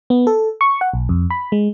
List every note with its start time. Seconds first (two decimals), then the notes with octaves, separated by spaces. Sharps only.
0.10 B3
0.27 A4
0.61 C#6
0.81 F#5
0.94 B1
1.09 F2
1.30 B5
1.52 G#3